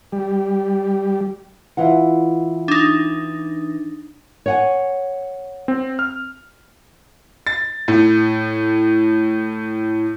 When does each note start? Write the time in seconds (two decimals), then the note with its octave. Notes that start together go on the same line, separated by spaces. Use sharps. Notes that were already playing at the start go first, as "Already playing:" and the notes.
0.12 G3
1.77 E3 F4 F#5
2.68 D4 D#4
4.46 C#5 F#5 G#5
5.68 C4
5.99 F6
7.47 A6
7.88 A2